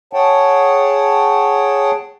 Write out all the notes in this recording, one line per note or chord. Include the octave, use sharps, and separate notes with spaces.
G#4 C#5 F#5 G5 A5